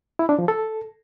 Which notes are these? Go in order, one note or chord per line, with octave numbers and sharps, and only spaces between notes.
E4
D4
F3
A4